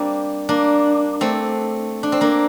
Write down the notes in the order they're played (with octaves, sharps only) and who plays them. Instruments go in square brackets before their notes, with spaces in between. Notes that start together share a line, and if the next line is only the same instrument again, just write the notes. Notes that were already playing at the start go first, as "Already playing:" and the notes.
Already playing: [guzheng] G3 A#3 C4 D4
A#3 D4
A3 C4
D4
C4
A#3 D4